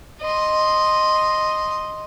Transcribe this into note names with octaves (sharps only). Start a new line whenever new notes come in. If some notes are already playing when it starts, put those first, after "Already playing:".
D#5 C6